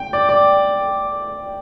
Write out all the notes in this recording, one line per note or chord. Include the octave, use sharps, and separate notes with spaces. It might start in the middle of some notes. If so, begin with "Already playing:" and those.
Already playing: G5
D5
D5